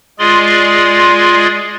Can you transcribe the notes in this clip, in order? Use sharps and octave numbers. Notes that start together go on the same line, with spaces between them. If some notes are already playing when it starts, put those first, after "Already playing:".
G#3 F4 G#4 D5 C6